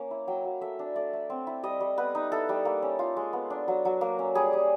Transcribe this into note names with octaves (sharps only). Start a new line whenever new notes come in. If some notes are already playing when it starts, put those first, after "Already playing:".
Already playing: A#3 C#4
E4
F#3 G5
F#3
A3 E5
D4
A3 D5
A3
C4
E4
G3 D#5
G3
B3 B4
D#4
E4 A4
G3
A#3
C#4
F4
G#3
B3
D4
F#3
F#3
A#3
C#4
G3 G#4
G3